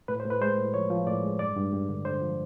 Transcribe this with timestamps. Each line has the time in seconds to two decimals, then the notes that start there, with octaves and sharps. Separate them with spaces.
0.08 A2 B4
0.20 C5
0.25 A2
0.30 B4
0.41 G#3 C5
0.58 A2
0.74 F3 C#5
0.90 F3
1.07 A2 D5
1.23 G#3
1.39 G2 D5
1.56 G2
1.73 G2
1.89 D3
2.05 D3 C5
2.22 F3